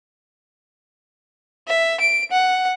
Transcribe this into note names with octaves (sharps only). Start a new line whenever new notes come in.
E5
D7
F#5